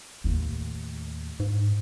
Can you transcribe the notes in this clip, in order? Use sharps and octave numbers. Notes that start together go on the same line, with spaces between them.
D#2 A2
G#2